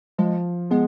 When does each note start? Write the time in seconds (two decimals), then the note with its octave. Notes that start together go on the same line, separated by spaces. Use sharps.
0.18 F3 G#3
0.71 G#3 B3